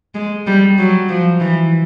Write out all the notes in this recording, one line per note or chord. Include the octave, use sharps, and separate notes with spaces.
G#3
G3
F#3
F3
E3